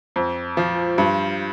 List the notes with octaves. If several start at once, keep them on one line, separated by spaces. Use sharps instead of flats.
F2
F3
G2